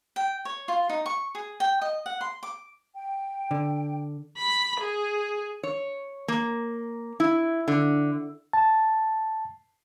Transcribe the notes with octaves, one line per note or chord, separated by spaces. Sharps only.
G5
C#5
F4
D#4
C#6
G#4
G5
D#5
F#5
C6
D6
G5
D3
B5
G#4
C#5
A#3
E4
D3
A5